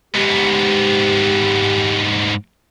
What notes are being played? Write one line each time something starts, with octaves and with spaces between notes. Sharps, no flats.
G#2 B3 G4